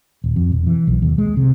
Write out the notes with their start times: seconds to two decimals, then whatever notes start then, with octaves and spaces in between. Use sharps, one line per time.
0.24 D#1
0.36 F2
0.52 E1
0.67 E3
0.87 B1
1.02 D#2
1.18 G#3
1.37 C3